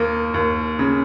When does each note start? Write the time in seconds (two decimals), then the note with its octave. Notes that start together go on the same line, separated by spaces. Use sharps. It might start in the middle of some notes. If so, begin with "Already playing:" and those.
Already playing: D#2 A#3
0.34 D#2
0.79 C#3